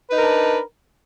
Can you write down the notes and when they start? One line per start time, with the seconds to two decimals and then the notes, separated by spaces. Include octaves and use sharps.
0.09 B4
0.13 D#4
0.16 A#4
0.20 D4